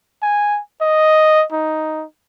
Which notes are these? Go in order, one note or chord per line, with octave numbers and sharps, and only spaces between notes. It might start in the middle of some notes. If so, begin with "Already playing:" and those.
G#5
D#5
D#4